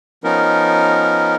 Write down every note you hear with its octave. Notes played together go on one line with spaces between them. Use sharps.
F3 B3 C#4 D#4 A#4